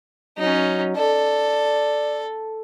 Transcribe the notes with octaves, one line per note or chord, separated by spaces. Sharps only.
F#3 C#4 D#4
A4 D5